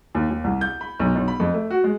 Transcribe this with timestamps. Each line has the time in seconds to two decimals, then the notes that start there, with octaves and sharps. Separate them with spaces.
0.15 D#2
0.30 D#2
0.44 C2
0.61 G6
0.81 B5
1.00 B1
1.15 B1
1.28 B5
1.40 F2
1.54 A3
1.70 F#4
1.84 G#3